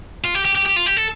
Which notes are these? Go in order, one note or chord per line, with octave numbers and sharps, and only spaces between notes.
F4
G4
G4
G4
G4
F4
G4
A4